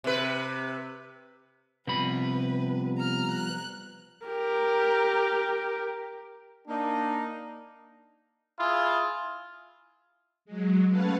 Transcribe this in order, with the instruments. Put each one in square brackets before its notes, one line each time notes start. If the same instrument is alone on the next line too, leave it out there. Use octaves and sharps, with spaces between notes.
[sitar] C3 B4
[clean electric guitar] C3 B5 [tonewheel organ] F3 G3 B3 [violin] B4
[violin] A#5 F6
F#6
[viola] G4 A#4
[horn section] A#3 D#4 [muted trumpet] D4
[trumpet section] E4 F4 G#4
[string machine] F#3 G#3
A3 C#4 B4 F5 F#5 A5